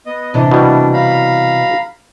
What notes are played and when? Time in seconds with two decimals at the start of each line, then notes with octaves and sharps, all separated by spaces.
0.06 B3 D#5
0.34 C3 E3 D4 D#5
0.51 B2 G3
0.93 F5 A#5 B5